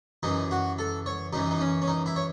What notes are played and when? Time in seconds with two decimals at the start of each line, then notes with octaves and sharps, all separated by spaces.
0.23 F#2 E3 D#4
0.51 F#4
0.79 A4
1.06 C#5
1.33 F#2 E3 D#4
1.51 D#4
1.61 C#4
1.82 C#4
1.88 D#4
2.06 E4
2.16 C#5